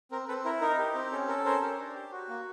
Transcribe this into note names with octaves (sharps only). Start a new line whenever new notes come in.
C4 A#4
C4 A4 B4
E4 A#4
D#4 A#4
G4
C4
C#4 A4
A4 A#4
C#4 A#4 C5
G4
D4
G4
F#4
A#3